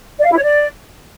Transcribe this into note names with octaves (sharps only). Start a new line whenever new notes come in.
D5
F5
E4
C#5
D5